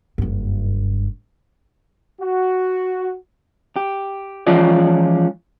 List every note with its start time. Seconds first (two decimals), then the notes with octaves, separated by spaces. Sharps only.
0.18 F#1 G2
2.20 F#4
3.76 G4
4.47 E3 F3 G#3 C#4 F4 D5